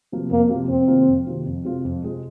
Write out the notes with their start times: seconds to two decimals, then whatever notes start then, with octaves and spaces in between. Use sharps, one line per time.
0.12 C3 F3 A#3
0.31 F2 A#3
0.49 C3 F3 A#3
0.69 F2 C4
0.88 C3 D#3 A#3 F4
1.08 F2
1.26 C3 D#3 A#3 F4
1.46 F2
1.65 C3 G#3 C4 F4
1.85 F2
2.03 C3 G#3 C4 F4